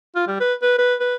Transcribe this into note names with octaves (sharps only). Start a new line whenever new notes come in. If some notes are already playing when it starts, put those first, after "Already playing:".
F4
G3
B4
B4
B4
B4